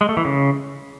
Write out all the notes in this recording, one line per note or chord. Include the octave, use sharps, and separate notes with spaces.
G#3
A3
E3
C#3